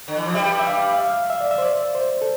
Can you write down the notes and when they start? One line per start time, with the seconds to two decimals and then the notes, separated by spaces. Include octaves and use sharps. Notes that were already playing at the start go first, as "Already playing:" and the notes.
0.08 D3
0.17 E3
0.26 F3
0.34 G2 G3 E5
0.59 E5
0.67 F5
0.94 F5
0.98 E5
1.30 E5
1.41 D5
1.51 E5
1.58 C5
1.62 D5
1.95 C5
2.22 A4